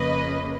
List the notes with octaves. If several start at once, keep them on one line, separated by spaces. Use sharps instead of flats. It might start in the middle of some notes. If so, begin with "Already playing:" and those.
Already playing: F2 C#3 F3 A#3 B4 D#5